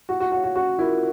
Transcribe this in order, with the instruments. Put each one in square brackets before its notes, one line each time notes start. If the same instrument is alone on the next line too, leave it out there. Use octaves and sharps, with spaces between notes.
[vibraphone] E4 [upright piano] F#4
[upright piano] F#4
[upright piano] F#4 [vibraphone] G#4 C#5 F5
[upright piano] F#4
[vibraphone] C#4 [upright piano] F#4
[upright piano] E4 [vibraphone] F4 A#4